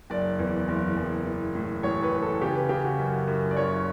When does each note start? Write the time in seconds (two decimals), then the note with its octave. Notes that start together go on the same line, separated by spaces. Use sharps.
0.10 F#1 D5
0.39 E2
0.68 F#1
0.97 F#1
1.26 E3
1.55 A2
1.83 A1 C#5
2.03 B4
2.12 E3
2.22 A4
2.41 C#3 G4
2.55 B4
2.69 C#3 G4
2.84 F#4
2.98 F#2
3.27 F#2
3.51 D5
3.57 F#1 C#5